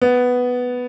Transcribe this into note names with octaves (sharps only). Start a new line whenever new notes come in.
B3